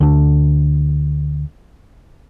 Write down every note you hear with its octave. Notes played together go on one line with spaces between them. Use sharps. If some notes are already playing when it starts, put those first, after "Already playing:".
D2 D4